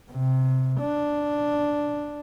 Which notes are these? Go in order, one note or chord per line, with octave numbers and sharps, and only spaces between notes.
C3
D4